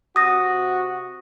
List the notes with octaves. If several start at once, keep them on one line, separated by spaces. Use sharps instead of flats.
C3 F#4 D#6 A#6